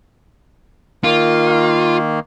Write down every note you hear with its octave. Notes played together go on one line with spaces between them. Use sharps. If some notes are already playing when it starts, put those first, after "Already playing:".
D#3 A#3 F4